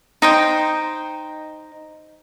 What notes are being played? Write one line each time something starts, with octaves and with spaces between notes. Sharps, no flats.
D#4 C5 G5